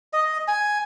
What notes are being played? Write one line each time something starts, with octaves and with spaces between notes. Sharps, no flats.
D#5
G#5